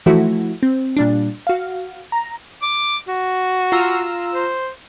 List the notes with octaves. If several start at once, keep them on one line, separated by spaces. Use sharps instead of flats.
E3 F3 A3 E4 F#4
C4
A#2 G3 D4
F#4 F5
A#5
D6
F#4
F4 A#5 E6
C5